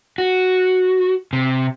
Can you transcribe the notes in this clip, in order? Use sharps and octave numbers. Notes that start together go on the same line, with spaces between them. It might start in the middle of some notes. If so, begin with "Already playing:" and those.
F#4
C3